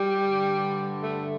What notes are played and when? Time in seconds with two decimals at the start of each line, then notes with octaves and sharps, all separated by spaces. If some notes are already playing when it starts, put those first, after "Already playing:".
Already playing: G3
0.20 G2 D3
1.01 A3